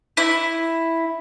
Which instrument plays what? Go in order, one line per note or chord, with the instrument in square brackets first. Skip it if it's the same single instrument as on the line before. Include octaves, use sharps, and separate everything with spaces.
[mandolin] E4